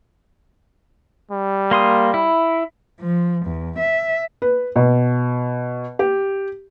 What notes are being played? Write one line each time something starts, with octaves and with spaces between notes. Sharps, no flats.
G3
A#3 C6 D#6
E4
F3
E2
E5
B4
B2
G4